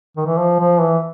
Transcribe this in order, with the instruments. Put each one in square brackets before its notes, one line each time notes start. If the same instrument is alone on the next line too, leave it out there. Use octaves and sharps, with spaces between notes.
[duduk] D#3
E3
F3
F3
E3